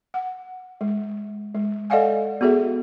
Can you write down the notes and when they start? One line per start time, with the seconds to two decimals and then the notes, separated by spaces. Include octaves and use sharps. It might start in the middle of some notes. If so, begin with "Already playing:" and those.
0.14 F#5
0.81 G#3
1.55 G#3
1.90 A4 D5 D#5 F5 F#5 G#5
2.41 B3 F#4 G#4 A4 E5